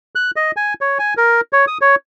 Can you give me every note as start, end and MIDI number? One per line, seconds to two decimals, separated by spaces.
0.15 0.31 90
0.36 0.51 75
0.56 0.74 80
0.81 0.98 73
0.99 1.14 80
1.17 1.41 70
1.53 1.65 73
1.68 1.78 87
1.81 1.95 73